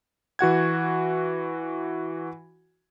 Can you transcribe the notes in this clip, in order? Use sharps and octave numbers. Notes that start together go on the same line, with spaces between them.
E3 F#4 F#5 G#6